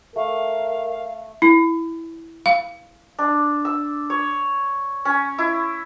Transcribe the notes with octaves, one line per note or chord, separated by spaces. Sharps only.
A3 A#4 F5
E4
F5
D4
E6
C#5
C#4
E4